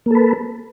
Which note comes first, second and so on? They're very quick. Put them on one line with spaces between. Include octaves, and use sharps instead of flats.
A#3 A4 B4